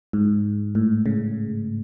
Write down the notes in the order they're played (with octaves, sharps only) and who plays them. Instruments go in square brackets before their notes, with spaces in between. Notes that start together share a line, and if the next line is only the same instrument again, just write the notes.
[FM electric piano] G#2
A2
C#3